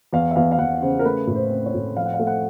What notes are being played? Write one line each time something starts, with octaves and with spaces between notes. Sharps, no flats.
E2 F5
E5
E2 F5
F5
E2 F#5
C#3 C5
A#4
A3 B4
A2
C5
C4
C#5
A2
F3 F5
F#5
F5
A3
F#5